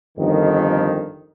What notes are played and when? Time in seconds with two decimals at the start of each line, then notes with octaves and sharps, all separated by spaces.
0.15 G1 F2 D#3